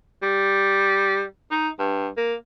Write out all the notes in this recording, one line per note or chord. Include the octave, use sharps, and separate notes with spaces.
G3
D#4
G2
A#3